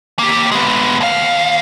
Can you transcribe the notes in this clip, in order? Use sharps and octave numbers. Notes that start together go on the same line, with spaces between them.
A#3 G4
G#3 B3
D#2 F5